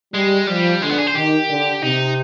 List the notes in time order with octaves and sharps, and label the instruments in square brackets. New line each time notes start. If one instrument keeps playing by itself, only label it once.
[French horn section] G3 [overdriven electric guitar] G#3
[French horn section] F3 [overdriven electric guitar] G3
[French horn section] D3 [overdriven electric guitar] G#3
[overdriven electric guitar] B3
G#4
C5
[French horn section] D#3 [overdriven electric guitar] G4
[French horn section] D3
[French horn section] C3 [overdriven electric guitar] D#4